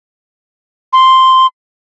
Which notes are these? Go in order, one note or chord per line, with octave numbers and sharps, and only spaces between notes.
C6